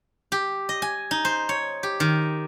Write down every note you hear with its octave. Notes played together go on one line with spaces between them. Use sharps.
G4
D#5
G#5
D#4
C5
C#5
G4
D#3